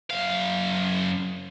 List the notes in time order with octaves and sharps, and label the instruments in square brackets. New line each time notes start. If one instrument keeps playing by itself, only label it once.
[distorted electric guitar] F#2 F5